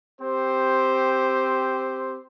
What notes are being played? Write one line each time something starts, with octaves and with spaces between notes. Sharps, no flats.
C4 G4 C5